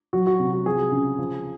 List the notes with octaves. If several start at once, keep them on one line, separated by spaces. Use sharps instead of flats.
F#3 F#4
F#4
C3
F#4
F3 G#4
C#3
F3